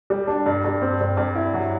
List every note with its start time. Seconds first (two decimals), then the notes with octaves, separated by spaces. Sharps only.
0.10 G3
0.27 D4
0.46 G2
0.64 G2
0.81 C4
1.00 G2
1.17 G2
1.35 E4
1.54 F#3